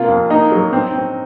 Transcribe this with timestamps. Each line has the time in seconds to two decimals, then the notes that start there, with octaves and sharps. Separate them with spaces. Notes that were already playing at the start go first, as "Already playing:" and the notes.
Already playing: C3 A#3 F4
0.08 F2
0.30 A#3 D#4
0.52 F#3
0.73 C4
0.94 C4